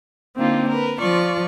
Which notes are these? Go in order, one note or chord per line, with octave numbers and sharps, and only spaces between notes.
D3 A#3 C4 D#4 F4
A#4 B4
F3 F4 D5 C#6